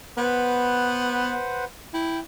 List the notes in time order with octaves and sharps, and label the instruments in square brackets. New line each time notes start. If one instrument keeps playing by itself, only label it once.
[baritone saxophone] B3 [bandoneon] B4 C5 F#5
[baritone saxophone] E4 [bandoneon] G5